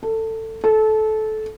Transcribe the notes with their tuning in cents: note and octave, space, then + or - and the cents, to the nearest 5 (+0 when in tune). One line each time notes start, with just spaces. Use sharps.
A4 +20
A4 -20